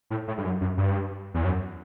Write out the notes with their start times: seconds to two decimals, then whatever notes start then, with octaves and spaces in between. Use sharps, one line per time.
0.10 A2
0.28 A2
0.38 G2
0.45 F#2
0.61 F#2
0.77 G2
1.34 E2
1.45 F#2